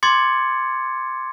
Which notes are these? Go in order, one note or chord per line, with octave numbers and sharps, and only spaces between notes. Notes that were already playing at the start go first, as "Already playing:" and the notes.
C6 D6 G#6 A6 C#7